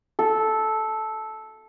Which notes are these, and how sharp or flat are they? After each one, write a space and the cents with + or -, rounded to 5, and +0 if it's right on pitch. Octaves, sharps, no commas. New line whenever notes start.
A4 -10